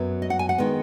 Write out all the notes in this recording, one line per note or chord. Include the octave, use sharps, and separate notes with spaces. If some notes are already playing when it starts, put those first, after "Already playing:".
Already playing: F#2 F#3 B3
D#5
F#5
G#5
F#5
D#3 G#3 B3